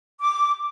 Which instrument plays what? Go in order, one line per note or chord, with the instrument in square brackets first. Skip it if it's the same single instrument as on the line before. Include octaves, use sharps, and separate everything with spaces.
[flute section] D6